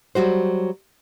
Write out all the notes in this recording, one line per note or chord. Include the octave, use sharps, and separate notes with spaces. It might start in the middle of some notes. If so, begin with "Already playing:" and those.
F#3 G3 F#4 C5